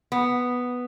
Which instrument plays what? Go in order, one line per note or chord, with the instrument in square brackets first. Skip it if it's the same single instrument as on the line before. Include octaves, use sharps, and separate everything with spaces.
[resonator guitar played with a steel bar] B3